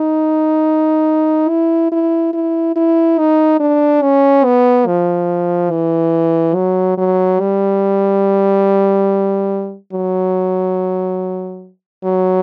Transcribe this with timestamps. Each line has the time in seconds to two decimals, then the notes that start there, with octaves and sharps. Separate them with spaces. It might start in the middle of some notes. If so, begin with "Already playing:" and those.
Already playing: D#4
1.49 E4
1.92 E4
2.33 E4
2.76 E4
3.18 D#4
3.60 D4
4.02 C#4
4.45 B3
4.87 F3
5.71 E3
6.55 F#3
6.97 F#3
7.40 G3
9.93 F#3
12.04 F#3